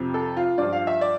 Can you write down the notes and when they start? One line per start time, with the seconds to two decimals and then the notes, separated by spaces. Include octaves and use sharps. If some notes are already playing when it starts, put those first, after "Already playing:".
Already playing: F2 C3 F3
0.14 A4
0.37 F4
0.58 G2 F3 D5
0.73 F5
0.87 E5
1.01 D5